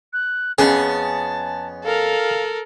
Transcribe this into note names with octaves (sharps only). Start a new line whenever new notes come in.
F#6
F2 B3 C#4 G#4 A5
A4 A#4 F5